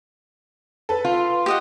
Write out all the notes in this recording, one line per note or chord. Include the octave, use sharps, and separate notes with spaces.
A4 B4
F4
G4 D#5 F#5